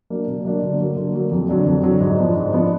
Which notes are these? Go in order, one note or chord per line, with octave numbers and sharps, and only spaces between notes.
F#3 A#3 D4
B2
F#3 A#3 D4
D3
F#3 A#3
D3
F#3 A#3
F2
D3 F#3 D4
F2
D3 F#3 D4
G#2
F3 B3 D4
G#2
F3 B3 D4